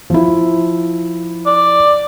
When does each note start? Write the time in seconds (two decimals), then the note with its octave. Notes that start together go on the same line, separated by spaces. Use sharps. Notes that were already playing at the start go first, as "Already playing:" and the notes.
0.10 F3 E4
1.46 D5